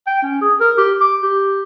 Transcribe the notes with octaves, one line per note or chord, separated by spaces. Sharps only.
G5
C#4
G#4
A#4
G4
D6
G4